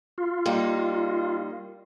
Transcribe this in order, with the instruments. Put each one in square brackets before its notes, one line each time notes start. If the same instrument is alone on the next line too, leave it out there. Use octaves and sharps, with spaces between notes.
[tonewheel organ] F4
[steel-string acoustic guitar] G3 A#3 D#4